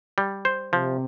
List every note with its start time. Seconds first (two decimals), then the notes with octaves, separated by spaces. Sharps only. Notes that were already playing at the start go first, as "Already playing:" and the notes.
0.18 G3
0.45 C5
0.73 C3 F3